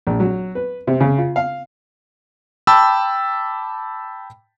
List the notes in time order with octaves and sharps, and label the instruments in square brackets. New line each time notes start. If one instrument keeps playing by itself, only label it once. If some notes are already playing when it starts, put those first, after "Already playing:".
[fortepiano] A#1
F#3
B4
C3
C#3
F4
F5
[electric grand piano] G5 A5 B5 D6 E6